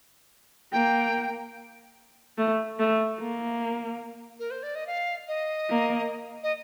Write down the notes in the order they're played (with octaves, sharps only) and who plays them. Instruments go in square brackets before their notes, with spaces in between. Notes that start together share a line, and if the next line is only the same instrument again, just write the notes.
[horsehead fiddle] A#3 [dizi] G5
[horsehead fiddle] A3
A3
A#3
[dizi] A#4
C5
D5
D#5
F5
D#5
[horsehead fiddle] A#3
[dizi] D#5